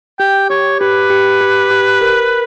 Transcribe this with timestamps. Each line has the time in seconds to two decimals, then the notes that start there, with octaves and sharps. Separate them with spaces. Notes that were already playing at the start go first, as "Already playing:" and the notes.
0.19 G4 G5
0.50 G4 C#5
0.80 G4 B4
1.10 G4
1.41 G4
1.71 G4
2.01 A#4